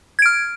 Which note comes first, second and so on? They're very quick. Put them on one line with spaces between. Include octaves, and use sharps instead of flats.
G#6 D7 F6